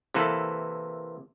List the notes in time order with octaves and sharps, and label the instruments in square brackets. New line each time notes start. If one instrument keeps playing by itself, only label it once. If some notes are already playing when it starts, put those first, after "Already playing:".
[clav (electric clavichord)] C3 E3 A#3 A4 B4